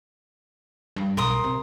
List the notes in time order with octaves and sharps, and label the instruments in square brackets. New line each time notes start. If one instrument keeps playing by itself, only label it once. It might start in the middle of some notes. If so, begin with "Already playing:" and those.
[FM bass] G2
[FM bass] B1 [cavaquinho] A#4 C6 D#6
[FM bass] C3